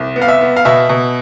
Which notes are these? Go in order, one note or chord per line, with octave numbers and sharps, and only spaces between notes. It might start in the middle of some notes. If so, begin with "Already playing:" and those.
Already playing: C2
B3
F5
E5
B3
F5
B2 E5
B2